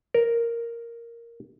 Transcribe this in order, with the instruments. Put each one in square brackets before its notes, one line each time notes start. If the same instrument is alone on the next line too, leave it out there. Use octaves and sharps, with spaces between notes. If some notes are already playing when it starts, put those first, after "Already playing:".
[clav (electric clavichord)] A#4